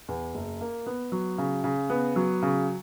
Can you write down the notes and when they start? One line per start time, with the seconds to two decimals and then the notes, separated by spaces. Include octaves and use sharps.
0.08 E2
0.34 F#1
0.61 A#3
0.86 B3
1.12 F#3
1.38 C#3
1.64 C#3
1.90 B3
2.16 F#3
2.42 C#3